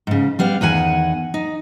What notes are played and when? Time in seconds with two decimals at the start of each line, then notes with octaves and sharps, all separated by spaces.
0.07 G#2 C#3
0.39 G3 B3 F5
0.61 E2 D#3 F#5 G#5
1.34 D#4